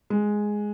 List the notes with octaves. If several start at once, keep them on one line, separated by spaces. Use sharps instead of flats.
G#3